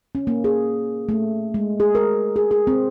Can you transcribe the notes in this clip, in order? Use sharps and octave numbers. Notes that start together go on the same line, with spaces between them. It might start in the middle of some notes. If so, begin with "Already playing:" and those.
C#4
A#3
G#4
A3
G#3
G#4
A#4
G#4
G#4
C4